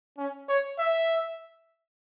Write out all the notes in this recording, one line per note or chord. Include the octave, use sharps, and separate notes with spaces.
C#4
C#5
E5